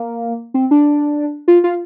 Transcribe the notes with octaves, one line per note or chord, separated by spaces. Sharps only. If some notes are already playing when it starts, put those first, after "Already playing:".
Already playing: A#3
C4
D4
F4
F4